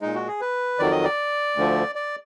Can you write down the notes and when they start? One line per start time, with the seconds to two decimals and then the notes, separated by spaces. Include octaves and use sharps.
0.01 A#2 G#3 D#4
0.15 F#4
0.27 G#4
0.41 B4
0.79 F2 D#3 F#3 D5
0.91 D#5
1.04 D5
1.56 D2 D3 F3
1.95 D5